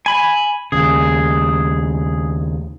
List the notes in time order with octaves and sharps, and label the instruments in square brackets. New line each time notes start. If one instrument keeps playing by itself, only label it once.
[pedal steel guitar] G#5 B5
[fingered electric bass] D#2 C#3 [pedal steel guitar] G#4